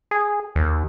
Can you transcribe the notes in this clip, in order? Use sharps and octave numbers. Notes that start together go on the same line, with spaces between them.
G#4
D#2